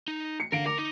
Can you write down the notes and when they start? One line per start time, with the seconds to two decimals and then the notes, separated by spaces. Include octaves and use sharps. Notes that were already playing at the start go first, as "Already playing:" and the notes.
0.08 D#4
0.40 C#7
0.52 D3 A#4 F5 D7
0.66 A#4 D6
0.78 D#4